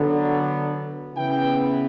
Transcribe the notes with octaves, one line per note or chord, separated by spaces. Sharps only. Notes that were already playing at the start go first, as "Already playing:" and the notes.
Already playing: D3 F#3 B3
C#3 E3 B3 G5